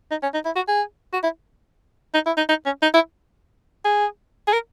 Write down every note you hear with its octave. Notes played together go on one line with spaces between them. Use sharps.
D#4
C#4
D#4
E4
F#4
G#4
F#4
E4
D#4
E4
D#4
D#4
C#4
D#4
E4
G#4
G#4
A#4